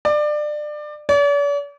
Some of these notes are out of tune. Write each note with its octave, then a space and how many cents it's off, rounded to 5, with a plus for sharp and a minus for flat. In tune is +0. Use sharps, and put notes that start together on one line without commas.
D5 +25
D5 -45